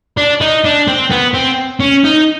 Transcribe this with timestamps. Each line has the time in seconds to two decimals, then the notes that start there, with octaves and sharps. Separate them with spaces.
0.17 D4
0.41 D#4
0.64 D4
0.87 C4
1.10 B3
1.34 C4
1.80 C#4
2.04 D#4